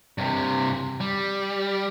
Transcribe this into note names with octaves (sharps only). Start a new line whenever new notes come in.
G2 C3
G3